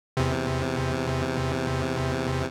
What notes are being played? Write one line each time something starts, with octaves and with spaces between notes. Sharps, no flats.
E2 C3